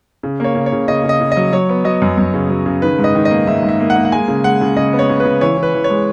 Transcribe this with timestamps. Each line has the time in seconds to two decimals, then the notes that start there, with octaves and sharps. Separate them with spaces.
0.23 C#3
0.40 A#3 C#5
0.55 C#3
0.66 C#5
0.72 C#3
0.88 C#3 D#5
1.04 C#3
1.09 D#5
1.20 C#3
1.32 D#5
1.37 F#3
1.52 F#3 C#5
1.69 B3
1.85 F#3 D#5
2.02 F#2
2.18 F#2
2.34 C#3
2.50 F#3
2.66 C#3
2.82 D#3 B4
2.99 G#2
3.04 D#5
3.15 D#3
3.25 D#5
3.31 A#3
3.47 G#2 E5
3.63 G#2
3.69 E5
3.80 A#3
3.90 F#5
3.96 A#3
4.05 F#5
4.12 G#3 G#5
4.28 C#3
4.44 G#3 F#5
4.61 C#3
4.76 C#3 D#5
4.93 B3
4.99 C#5
5.09 C#3
5.20 C#3 B4
5.41 E3 C#5
5.57 E3
5.63 B4
5.74 E3
5.84 C#5
5.90 G#3